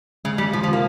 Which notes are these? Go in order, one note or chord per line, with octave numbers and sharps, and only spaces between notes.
C#3 G#3
G3 G#3
C3 F3
F3
C3
A#3